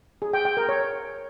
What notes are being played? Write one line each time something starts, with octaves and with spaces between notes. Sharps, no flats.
G#4
G5
G5
A#4
C#5